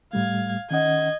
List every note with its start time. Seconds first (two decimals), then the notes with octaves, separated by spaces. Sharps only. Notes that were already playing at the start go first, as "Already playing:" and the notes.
0.13 A2 G3 A3 F5 G#6
0.71 D#3 C#4 D#5 F#5 G#6